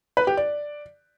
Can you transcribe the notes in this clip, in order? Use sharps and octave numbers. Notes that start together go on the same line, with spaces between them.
B4
G4
D5